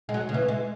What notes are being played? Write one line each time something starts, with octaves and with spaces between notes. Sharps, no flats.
G#3
F#3
C#3
E3
G#3